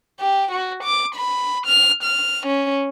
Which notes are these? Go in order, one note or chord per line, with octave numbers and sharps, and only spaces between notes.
G4
F#4
D6
B5
F6
F6
C#4